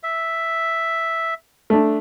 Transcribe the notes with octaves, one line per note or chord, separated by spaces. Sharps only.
E5
A3 D4